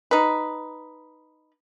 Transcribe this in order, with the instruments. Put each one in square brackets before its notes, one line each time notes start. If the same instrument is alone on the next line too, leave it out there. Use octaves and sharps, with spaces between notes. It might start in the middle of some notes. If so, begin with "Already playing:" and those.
[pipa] D#4 B4